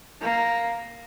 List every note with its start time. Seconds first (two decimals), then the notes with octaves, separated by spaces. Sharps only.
0.21 A#3